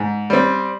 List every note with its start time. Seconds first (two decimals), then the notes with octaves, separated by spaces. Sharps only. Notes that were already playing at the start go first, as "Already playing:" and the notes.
Already playing: G#2
0.30 G3 C4